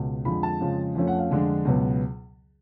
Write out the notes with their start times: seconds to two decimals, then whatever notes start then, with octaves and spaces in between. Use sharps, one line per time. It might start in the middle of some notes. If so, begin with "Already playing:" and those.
Already playing: C#2 B2
0.25 F2 D3 F3 G#3 B5
0.43 A5
0.61 F2 C#3 F3 G#3
0.95 F2 F3 A3 C#4
1.07 F#5
1.19 F5
1.30 F2 D3 G#3 D4
1.65 C#2 B2 F#3 B3